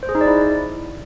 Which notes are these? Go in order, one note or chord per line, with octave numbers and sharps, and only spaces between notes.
C5
G#4
D#4
D5
E4